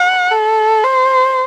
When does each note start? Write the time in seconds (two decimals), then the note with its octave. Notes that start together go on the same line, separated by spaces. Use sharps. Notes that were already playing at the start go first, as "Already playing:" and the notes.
Already playing: F#5
0.31 A4
0.84 C5